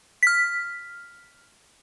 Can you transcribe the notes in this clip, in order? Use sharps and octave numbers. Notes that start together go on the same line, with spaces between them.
F6 B6